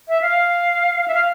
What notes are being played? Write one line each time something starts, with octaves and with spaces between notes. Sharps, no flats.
E5
F5
E5
F5